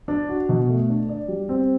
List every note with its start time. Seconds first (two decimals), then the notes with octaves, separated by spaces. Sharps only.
0.08 D4
0.29 F#4
0.49 B2
0.69 A3
0.89 D4
1.09 D5
1.28 G3
1.49 C4